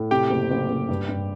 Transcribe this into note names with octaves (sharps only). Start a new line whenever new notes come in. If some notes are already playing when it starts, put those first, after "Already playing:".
Already playing: A2
C3 G4 G5
F#1
F#1
F#1
G2
G2